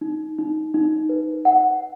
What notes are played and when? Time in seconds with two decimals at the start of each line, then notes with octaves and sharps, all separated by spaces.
0.01 D#4
0.39 D#4
0.74 D#4
1.09 B4
1.45 F#5